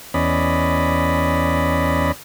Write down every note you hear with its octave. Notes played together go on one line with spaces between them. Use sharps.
E2 C#4 D5 D#5 B5